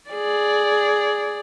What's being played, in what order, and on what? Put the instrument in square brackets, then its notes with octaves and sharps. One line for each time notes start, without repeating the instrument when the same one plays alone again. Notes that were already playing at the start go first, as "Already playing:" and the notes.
[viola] G#4 D5